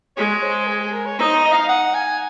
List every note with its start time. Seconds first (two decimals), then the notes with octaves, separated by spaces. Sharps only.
0.17 G#3 C#5
0.42 C5
0.68 G#4
0.80 G#4
0.93 A#4
1.06 C#5
1.18 D#4 C5
1.35 D#5
1.45 D#5
1.52 F5
1.69 F#5
1.94 G#5